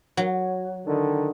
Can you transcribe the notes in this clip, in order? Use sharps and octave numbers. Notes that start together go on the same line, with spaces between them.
F#3
D3 D#3